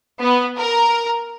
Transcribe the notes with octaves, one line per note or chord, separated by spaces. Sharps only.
B3
A#4